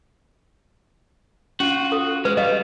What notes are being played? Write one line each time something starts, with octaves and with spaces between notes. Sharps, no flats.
C#4 F4 F#4
A4 D#6
G#3 B4
G3 D#5 F5